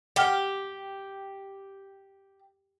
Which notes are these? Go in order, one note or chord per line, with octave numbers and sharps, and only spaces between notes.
G4 F#5 G5 F6